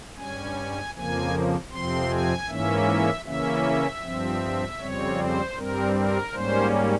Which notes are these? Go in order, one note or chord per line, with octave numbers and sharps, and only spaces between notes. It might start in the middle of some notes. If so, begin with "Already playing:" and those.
G2 G3 C#4 G#5
F2 C#3 F3 A#3 G#5
F2 C3 F3 C4 C6
G#5
G#2 E3 A#3 C#4 E5
C#3 E3 A#3 C#4 E5
G2 F3 C4
F2 C#3 G3 C4 C#5
C5
G2 G3 C4 A#4
A#4
G#2 G3 A#3 C#4 C5